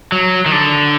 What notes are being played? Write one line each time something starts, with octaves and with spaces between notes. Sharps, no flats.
F#3
D#3
D3